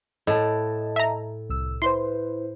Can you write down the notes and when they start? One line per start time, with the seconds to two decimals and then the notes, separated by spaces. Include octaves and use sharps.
0.27 A2 D#5 A5
0.96 E5 A#5
1.50 C2 E6
1.82 E4 B4 C5 C6